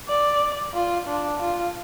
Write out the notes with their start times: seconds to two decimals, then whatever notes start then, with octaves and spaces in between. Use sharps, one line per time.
0.09 D5
0.74 F4
1.08 D4
1.40 F4